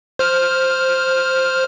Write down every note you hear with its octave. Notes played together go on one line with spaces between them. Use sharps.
C5 F6